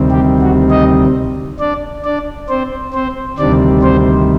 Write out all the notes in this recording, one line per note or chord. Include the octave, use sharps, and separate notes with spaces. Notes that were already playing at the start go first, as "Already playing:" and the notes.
Already playing: D2 C3 D#3 G3 C4
G4
F#4
D#4 D#5
D4 D5
D4 D5
C4 C5
C4 C5
D2 C3 D#3 G3 C4 D4 D5
C4 C5